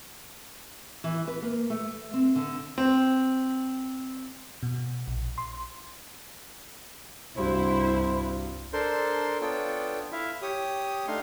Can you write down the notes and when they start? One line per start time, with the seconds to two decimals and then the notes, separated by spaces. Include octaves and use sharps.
1.04 E3
1.27 B4
1.42 A#3
1.70 A3
2.14 C4
2.36 D3
2.78 C4
4.63 B2
5.07 A#1
5.38 C6
7.38 C2 G2 E4 F#4 C5
8.73 D4 A4 A#4 C5 C6
9.41 B3 D4 F4 A4 C#5 G5
10.12 E4 E5 F5
10.42 G4 C#5 D#6
11.08 A3 D4 D#4 F5 C6